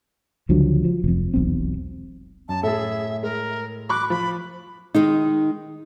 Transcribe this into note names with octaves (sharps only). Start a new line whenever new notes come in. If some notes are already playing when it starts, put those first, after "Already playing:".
C#2 D3 F3 F#3
F3
F1 F2
E1 B1 C4
F#2 A5
A2 G#4 A4 E5
G#3 A#4
B5 C#6 D6 F#6
F3 B5
D#3 G#3 D#4